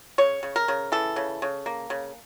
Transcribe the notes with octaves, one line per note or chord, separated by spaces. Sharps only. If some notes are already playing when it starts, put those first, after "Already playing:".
C#3 C#5
C#3
A#4
C#3
E3 A4
C#3
C#3
A#3
C#3